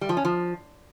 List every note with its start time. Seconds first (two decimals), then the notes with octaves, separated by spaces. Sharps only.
0.01 G3
0.09 F3
0.17 C#4
0.25 F3